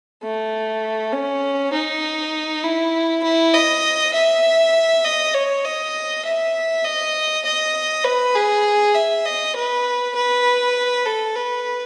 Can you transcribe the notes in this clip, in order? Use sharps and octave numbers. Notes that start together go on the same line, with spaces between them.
A3
C#4
D#4
E4
E4
D#5
E5
D#5
C#5
D#5
E5
D#5
D#5
B4
G#4
E5
D#5
B4
B4
A4
B4